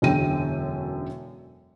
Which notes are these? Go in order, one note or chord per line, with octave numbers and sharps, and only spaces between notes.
E1 F#2 D3 G5 D#7